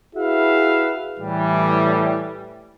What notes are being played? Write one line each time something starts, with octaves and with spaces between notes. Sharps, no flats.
E4 F#4 G#4 B4 E5 F5
A2 E3 G3